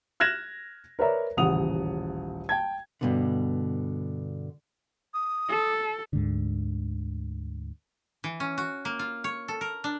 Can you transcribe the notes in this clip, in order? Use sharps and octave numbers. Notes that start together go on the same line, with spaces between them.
F6 F#6 G#6 A#6 E7
A#4 B4 C#5 D5 E5 A#5
D#1 A1 C#3 F#5 D#6 F7
G5 A5 G#6
G2 B2 D3
D#6
A4
D2 G#2 D3
E3
C#4
F#4
A#3
F4
C#5
A4
A#4
D4